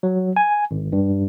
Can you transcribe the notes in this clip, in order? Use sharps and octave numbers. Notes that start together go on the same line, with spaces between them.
F#3
G#5
G#1
G2